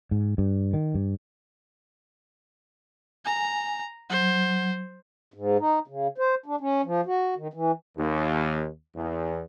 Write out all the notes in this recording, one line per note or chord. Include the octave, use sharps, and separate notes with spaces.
G#2
G2
D#3
G2
G#5 A#5
F#3 C5
G#2
D#4
C#3
C5
D4
C#4
F3
F#4
D#3
E3
D#2
E2